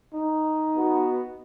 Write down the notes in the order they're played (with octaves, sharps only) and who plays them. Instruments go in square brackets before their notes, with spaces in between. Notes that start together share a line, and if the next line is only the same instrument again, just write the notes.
[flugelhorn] D#4
[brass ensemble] B3 F#4